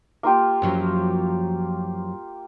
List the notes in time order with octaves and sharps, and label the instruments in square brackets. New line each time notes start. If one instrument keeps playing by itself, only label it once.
[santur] A#3 F4 G4
[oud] F#2 F3 F#3